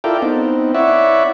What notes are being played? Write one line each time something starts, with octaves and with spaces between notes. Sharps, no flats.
E4 F4 A4 A#4 D5 G5
B3 C4 D#4
E4 C#5 D5 E5 F#5